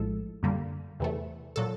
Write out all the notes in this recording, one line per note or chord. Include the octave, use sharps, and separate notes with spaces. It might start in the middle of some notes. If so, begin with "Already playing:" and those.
Already playing: A#1 A2 F3 G#3 A4
F#2 D3 G3 A#3
E2 C3 E3 A3
A#2 F#3 A4